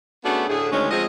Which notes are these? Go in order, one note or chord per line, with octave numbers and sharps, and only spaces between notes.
A3 B3 C#4 D4 F#4 G#4
A2 D3 G#4
D2 D#3 G#3 C#4
F3 G#3 C4 D#5